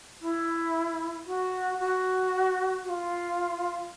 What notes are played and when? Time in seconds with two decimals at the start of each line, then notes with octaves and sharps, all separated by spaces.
0.21 E4
1.26 F#4
1.79 F#4
2.84 F#4
2.89 F4